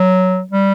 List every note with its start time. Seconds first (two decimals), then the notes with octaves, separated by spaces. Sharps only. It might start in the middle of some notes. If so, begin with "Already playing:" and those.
Already playing: F#3
0.52 G3